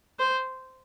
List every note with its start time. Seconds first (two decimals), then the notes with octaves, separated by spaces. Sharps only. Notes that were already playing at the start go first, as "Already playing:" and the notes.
0.19 C5